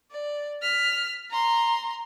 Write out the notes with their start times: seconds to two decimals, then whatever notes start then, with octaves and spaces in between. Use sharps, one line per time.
0.11 D5
0.62 F6 B6
1.31 A#5 C6